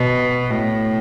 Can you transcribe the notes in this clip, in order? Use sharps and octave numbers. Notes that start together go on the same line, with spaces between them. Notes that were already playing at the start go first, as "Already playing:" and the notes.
Already playing: B2
A2